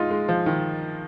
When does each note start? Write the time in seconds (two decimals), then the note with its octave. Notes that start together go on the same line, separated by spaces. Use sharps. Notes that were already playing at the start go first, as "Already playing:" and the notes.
Already playing: G#3 D#4 F4
0.11 G#3
0.29 F3
0.46 D#3